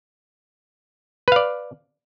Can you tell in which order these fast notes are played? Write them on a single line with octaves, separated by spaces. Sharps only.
B4 F5 D5